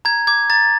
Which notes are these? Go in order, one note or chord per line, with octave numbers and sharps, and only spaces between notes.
A#5 G#6
D6 G#6
A#5 A6